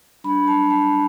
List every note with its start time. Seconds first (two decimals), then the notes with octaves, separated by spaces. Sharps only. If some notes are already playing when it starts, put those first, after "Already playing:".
0.24 G3 D4 B5
0.47 A5
0.70 A5